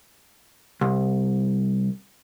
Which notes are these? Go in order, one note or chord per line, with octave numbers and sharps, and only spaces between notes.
C2